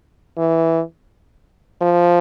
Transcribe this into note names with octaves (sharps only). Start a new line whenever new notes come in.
E3
F3